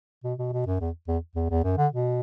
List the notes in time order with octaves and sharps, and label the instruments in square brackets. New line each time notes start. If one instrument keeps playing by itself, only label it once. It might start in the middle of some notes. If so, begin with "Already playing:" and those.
[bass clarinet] B2
B2
B2
F#2
E2
E2
E2
E2
F#2
D3
B2